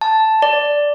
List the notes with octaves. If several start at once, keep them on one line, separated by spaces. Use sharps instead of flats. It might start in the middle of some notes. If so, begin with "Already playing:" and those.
A5
D5